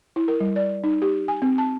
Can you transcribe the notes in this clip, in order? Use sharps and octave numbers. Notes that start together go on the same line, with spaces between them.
E4
A#4
G3
D5
D#4
G4
G#5
C4
A5